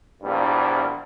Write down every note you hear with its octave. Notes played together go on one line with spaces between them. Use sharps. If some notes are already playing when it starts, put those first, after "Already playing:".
A#1 E2 G2 A#2